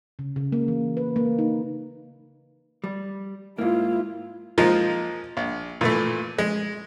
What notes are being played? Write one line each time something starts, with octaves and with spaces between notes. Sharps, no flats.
C#3
C#3
A#3
E3
B4
A#3
D#4
G3
G#2 A#3 E4 F4
F3 G#3 A#3 D#4 F4
A#1
A#2 E3 A3
G#3